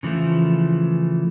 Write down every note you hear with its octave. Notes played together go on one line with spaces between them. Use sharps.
C#3 E3 F3 A3